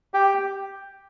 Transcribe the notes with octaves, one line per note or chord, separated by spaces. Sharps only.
G4